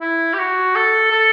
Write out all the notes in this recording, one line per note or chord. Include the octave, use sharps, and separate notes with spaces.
E4
G4
F#4
A4
A4